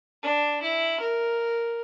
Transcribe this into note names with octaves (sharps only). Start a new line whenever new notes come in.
D4
E4
A#4